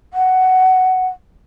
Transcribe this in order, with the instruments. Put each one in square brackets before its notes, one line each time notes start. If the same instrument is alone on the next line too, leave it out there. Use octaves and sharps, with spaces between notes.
[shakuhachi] F#5